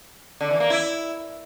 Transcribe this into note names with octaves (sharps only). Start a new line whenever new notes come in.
D3
E3
A#3
E4